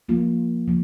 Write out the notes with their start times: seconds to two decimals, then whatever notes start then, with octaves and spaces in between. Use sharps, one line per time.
0.09 F3 A#3 F4
0.68 F3 A#3